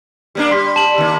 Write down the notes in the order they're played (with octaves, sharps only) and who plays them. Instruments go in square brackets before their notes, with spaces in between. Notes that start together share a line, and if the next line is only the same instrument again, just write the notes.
[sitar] G3 A#3 D4
[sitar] G3 [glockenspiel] C6 B6
[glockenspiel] A5 F#7
[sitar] D#3 A#3